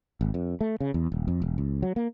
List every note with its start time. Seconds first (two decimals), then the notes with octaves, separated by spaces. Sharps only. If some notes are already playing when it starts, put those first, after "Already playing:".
0.21 G#1
0.34 F2
0.61 A3
0.80 C#3
0.94 E2
1.12 D#1
1.28 F2
1.42 E1
1.58 C#2
1.83 F#3
1.96 A#3